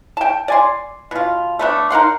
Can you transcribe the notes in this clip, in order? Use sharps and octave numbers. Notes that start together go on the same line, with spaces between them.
G5 A5
D5 G#5 C6
B2 F4
A3 B3 D4
D#4 A#4 F#5 C6